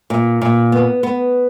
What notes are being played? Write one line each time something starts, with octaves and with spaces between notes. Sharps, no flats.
A#2
A#2
B3
B3